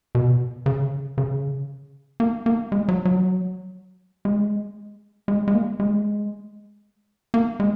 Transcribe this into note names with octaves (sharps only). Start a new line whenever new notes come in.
B2
C#3
C#3
A#3
A#3
G#3
F#3
F#3
G#3
G#3
G#3
A#3
G#3
A#3
G#3